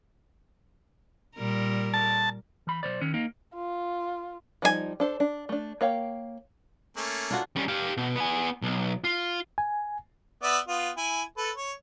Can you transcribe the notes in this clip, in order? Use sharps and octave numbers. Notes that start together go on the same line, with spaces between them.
A#2 G3 A#4
A5
E3 B5
B1 D#3 C5 D5
D#3 C#4
A#3 D#4
F4
F3 G3 D#4 F4 G#5
D4 A4 C5
D4
A3 D4
A#3 C#5 F5 G5
A3 A#3 C#4
D4 F4 F#4
G3 C#4
G4 F5
B2
B3 G#5
B1
F4
G#5
B3 D5 E5
B3 F4
E4 G#5
A4 B4
C#5